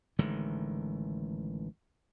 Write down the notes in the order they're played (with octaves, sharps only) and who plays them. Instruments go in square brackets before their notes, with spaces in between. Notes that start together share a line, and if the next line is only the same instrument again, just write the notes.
[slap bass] A1 D3 D#3 G#3